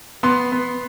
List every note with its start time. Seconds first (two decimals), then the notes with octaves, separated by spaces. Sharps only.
0.23 B3 C6
0.52 B3